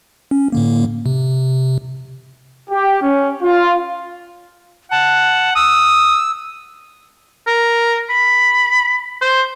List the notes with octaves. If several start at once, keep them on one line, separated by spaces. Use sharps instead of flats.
C#4
A2 D3 A#3
C3
G4
C#4
F4
F#5 A5
D#6 E6
A#4
B5
C5